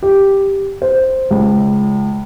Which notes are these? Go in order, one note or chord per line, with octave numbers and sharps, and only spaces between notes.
G4
C5
C#2